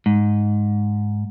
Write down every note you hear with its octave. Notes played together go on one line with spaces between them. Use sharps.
G#2